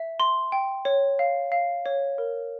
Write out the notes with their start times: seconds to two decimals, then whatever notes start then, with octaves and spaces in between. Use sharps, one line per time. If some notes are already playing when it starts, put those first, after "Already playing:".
Already playing: E5
0.20 C6
0.52 G5
0.85 C#5
1.19 F5
1.52 F5
1.86 C#5
2.18 A#4